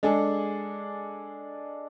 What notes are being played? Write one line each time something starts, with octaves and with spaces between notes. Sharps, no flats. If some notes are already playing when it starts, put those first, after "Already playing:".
G#3 D4 G#4 A4